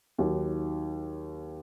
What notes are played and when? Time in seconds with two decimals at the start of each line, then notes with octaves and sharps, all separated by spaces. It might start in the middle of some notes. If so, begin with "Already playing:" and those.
0.18 D#2 D#3 F#3